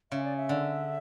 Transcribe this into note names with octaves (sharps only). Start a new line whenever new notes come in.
C#3 E5
D5
E5
D3